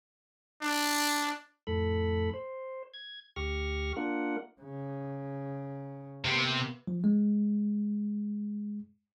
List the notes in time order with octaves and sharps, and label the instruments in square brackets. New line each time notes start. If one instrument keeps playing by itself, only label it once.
[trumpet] D4
[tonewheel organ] F2 A2 A4 B5
C5
G#6
D2 G4 C#6 F6 A#6
A#3 D4 F4 A#4 F#5
[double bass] C#3
[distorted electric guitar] C3 [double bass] A#3 B3
[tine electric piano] F3
G#3